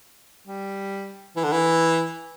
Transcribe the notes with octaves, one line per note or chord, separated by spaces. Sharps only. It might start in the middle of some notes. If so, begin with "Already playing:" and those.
G3
E3
D3
E3